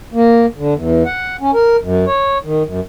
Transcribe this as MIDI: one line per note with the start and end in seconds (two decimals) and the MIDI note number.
0.14 0.46 58
0.57 0.74 50
0.75 1.03 40
1.06 1.36 78
1.41 1.51 61
1.54 1.77 70
1.82 2.05 42
2.06 2.38 73
2.45 2.63 51
2.66 2.80 42